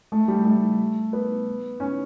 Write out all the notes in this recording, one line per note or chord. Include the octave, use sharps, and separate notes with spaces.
A3
G3
A3
B3
C#4